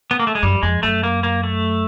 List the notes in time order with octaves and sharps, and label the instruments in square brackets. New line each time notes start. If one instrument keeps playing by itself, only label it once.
[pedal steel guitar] B3
A#3
A3
G#3
[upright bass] F#2 [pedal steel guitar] G3
[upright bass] F2 [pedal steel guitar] G#3
[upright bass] F#2 [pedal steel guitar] A3
[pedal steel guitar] A#3
A#3
A3